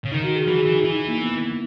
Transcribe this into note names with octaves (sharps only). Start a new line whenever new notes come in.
C#3
D#3 D#4
F#4
G#4
E3 F#4
G#4
E3
D#4
E3 E4
D#4
A#3
B3